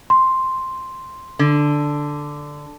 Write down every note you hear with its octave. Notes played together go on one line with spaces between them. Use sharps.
C6
D3